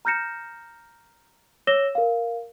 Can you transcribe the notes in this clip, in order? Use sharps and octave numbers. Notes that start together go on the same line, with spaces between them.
A#5 F6 G6 A#6 C#7 E7
C#5 D6 E6 A#6 E7 G7
A#4 F5